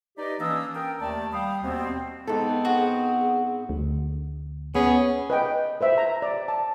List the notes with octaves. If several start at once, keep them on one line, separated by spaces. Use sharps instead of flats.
D#4 G4 B4 D5 D#5
E3 A#3 C#4 D4 D#6 E6
A#4 G5
D#2 D#3 A3 D5 A5
G3 F5 G5 B5 D#6
D#2 B2 G3 B3 C4
G#2 B3 C4 A4
F#4 G#4
D2
B3 C#4 G#4
B4 D#5 G5
B4 C5 E5
A#5
D5
A5